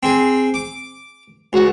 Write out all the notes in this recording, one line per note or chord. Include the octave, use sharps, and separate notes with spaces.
C4 G#4
D6
C#2 F#4